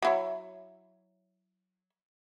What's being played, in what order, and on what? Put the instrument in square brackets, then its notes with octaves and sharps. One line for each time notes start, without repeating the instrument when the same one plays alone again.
[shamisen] F#3 E4 C#5